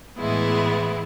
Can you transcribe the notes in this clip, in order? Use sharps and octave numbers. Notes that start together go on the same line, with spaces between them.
A2 E3 G#3 B3 E4